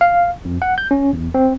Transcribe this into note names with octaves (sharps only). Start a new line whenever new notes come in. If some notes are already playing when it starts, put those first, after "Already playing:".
F5
F2
F#5
G6
C#4
E2
C4